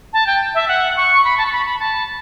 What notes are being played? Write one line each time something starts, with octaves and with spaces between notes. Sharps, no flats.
A5
G5
E5
F#5
C#6
B5
A5
C#6
B5
B5
A5